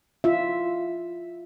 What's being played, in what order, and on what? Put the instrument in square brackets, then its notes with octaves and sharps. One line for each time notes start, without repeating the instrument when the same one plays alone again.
[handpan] F4 E5